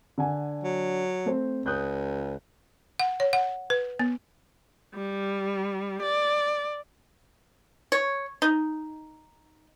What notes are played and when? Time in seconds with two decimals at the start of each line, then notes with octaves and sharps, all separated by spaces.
0.18 D3 F#5 G#5
0.64 F#3
1.26 A3 C4 C5
1.66 C#2 D#6 F#6 G6
2.99 F#5
3.20 C#5
3.33 F#5
3.70 B4
3.99 B3
4.94 G3
6.02 D5
7.92 C#5
8.42 D#4